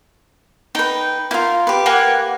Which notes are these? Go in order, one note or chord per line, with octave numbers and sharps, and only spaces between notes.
D#4 B4 G5
E4 F4 A#4
G4 B4
A#3 F#5 G#5